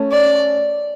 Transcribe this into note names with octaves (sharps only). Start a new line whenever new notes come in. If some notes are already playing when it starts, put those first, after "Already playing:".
Already playing: A3 C#4
D5